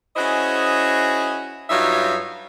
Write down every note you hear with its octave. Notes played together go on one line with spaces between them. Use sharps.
C#4 E4 F#4 G#4 C5 D#5
G2 F#3 D#4 F4 C#5 E5